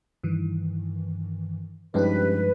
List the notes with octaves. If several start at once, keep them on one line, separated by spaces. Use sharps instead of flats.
G2 D#3 E3
G2 F3 G#3 C#4 D#4 G4 B4